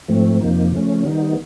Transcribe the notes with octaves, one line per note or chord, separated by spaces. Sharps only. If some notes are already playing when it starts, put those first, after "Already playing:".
G#2 F3 A3 C4
F2 C3 F3 A#3 D#4
C#3 F3 A3 C#4
D#3 G3 B3 D#4